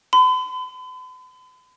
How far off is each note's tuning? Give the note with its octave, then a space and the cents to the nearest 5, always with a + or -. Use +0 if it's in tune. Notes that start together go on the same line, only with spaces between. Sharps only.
B5 +45